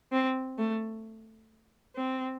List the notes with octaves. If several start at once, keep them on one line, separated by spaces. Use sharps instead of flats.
C4
A3
C4